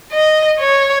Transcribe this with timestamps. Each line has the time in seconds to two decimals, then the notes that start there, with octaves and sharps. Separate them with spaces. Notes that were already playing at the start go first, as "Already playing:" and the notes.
0.12 D#5
0.60 C#5